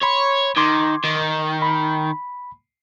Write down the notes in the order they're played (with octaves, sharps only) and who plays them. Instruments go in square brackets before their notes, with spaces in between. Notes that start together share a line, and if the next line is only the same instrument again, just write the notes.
[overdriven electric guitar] C#5 [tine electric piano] B5 C6
[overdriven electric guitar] D#3 [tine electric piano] C6 D6 G#6
[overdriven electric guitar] D#3
[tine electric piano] B5